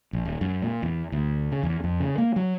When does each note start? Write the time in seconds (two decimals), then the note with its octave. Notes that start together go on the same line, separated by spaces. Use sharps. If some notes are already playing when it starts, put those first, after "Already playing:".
0.13 A#1
0.25 D#1
0.41 F#2
0.62 A#2
0.82 E2
1.12 D2
1.52 C#3
1.63 E2
1.84 F2
2.00 C#3
2.18 A#3
2.36 F#3